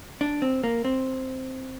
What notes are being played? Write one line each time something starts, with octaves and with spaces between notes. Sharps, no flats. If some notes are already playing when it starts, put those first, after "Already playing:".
D4
C4
A#3
C4